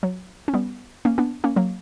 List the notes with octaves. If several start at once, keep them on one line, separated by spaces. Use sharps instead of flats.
F#3
C#4
G3 B3
A#3 C#4
B3 D4
A#3 C#4
F#3 A#3